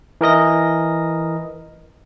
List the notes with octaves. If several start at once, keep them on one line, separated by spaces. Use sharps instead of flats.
E3 A#4 D#5 A#6